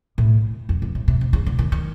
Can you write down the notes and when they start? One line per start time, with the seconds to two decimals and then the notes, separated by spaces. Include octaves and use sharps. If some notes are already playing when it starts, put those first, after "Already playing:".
0.18 A2
0.69 F2
0.82 F2
0.95 A2
1.08 C3
1.21 C3
1.33 C#3
1.46 D3
1.59 D#3
1.72 D#3